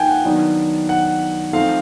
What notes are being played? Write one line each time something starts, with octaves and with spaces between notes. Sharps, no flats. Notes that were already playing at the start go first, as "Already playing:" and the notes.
Already playing: F3 A#3 D#4 G5 G#5
F#5
D#3 F#3 B3 D4
F#5
F3 A3 C4 D#4 F5